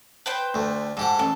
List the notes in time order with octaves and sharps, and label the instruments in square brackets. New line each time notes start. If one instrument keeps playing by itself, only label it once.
[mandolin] B4 C5 G5
[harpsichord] D2 A3
[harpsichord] G#2 G4 F#5 [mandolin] A4
[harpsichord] A1 [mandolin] A4